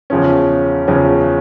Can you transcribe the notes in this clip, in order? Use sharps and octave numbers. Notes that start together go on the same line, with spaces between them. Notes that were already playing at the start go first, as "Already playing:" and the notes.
E2 C#3 F3 C#4
E2 C#3 F3 C#4